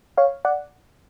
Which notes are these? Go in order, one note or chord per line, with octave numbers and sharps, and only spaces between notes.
C#5 F5
D5 F#5